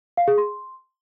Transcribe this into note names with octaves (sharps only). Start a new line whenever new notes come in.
F5
G#4
C6